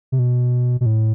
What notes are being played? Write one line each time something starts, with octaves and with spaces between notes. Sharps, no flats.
C3
B2
B2
A2